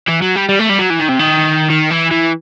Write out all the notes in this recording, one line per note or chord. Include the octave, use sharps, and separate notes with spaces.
E3
F#3
G3
G3
A3
G3
F#3
E3
D#3
C3
D#3
D#3
E3
E3